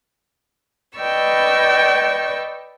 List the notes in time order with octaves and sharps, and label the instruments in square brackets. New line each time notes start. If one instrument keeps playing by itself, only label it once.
[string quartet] B4 D5 D#5 G5 C#6 E6